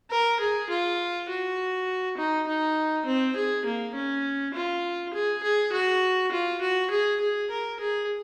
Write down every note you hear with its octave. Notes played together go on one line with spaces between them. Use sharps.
A#4
G#4
F4
F#4
D#4
D#4
C4
G#4
A#3
C#4
F4
G#4
G#4
F#4
F4
F#4
G#4
G#4
A#4
G#4